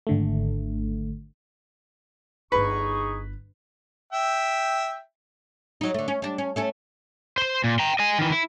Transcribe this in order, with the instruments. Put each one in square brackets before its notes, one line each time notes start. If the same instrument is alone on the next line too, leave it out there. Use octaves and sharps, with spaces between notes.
[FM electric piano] G#1 D3 A3
[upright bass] D1 G1 [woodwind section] D#4 G#4 C#6 [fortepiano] B4
[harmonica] E5 G5
[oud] F#3 D#4
D3 A3
C#4
G3 D4
C#4
A3 C#4 A4
[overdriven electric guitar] C5 C6
A#2
G5 A#5
D#5 G#5
D#3 E3
E4